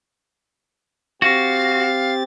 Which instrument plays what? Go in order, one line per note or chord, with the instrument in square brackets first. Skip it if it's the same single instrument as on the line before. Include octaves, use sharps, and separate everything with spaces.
[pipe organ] C4 G4 A6 [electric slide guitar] F#4 [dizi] F5